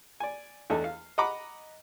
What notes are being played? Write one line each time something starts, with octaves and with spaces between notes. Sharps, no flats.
D5 G#5
E2 A3 D4 A4 D#5
F5
D#5 F#5 A#5 B5 D6